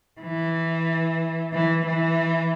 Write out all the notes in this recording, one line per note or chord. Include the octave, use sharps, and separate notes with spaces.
E3
E3
E3